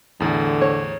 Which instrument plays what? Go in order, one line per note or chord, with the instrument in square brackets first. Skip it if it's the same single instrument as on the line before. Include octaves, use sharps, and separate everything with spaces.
[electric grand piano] E2 A2 [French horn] D3
[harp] C#5